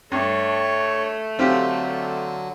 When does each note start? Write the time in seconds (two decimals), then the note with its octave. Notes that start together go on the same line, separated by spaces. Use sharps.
0.12 G2 A3 C#5
1.39 D3 F#3 C4 F4 G4